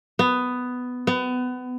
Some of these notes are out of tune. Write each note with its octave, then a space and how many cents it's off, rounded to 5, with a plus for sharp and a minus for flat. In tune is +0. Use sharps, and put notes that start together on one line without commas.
B3 +10
B3 +25